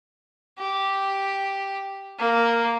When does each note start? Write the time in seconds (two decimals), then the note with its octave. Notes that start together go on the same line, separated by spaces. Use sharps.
0.59 G4
2.18 A#3